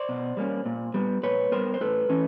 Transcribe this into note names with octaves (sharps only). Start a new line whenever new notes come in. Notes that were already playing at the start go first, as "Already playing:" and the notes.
Already playing: C5 D5
B2
G3 A#3 C#4
A#2
G3 B3
A#2 B4 C#5
G3 B3 A#4 C5
C5
A2 A4 B4
E3 A3 C#4